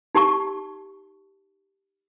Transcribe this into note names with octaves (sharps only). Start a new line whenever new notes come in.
D#4 G4 A5 C#6